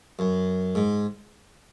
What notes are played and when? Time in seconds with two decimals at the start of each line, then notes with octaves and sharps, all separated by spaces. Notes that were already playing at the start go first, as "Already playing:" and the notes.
0.19 F#2
0.75 G#2